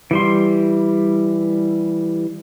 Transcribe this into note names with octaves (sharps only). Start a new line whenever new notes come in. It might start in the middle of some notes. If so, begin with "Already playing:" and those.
E3 G3 C6